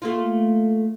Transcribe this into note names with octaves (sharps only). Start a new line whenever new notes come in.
A3 A#3 F4